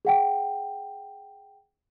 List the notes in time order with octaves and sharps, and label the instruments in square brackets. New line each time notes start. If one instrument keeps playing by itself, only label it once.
[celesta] G#4 F#5 G5